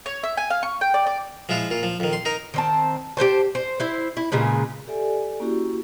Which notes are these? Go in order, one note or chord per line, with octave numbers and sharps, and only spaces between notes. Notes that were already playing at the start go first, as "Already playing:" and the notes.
C#5
E5
G#5
F5
C#6
G5
D5
D5
F3 G#3 E4 F4
A#2 F4
F3
F2 D#3
C6
D#4 A#4
D#3 C4 A5
G4 B4 C5 A5
C5
E4 C5
E4
A#2 C#3 G#3 B3
G4 A4 D5 E5 G#5
A#3 C#4 E4 F#4 G4